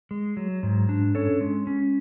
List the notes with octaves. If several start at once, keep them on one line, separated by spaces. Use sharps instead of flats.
G#3
F#3
G#2
D4
C#4 A4 C#5
G#3
C#4